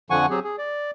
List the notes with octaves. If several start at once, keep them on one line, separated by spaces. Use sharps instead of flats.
F2 D3 F3 F#5 G#5 C#6
F#3 C4 G4 G#4
G#4
D5